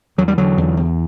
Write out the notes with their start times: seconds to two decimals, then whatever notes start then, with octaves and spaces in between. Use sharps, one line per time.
0.18 E2 F#3
0.28 G3
0.38 D3 F#3
0.57 E2
0.77 E2